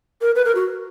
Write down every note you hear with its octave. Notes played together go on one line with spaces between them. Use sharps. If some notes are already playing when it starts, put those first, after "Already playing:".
A#4
B4
A#4
F#4